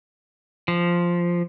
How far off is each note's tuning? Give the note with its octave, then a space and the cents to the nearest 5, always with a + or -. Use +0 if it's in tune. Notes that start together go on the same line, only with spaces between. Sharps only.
F3 -5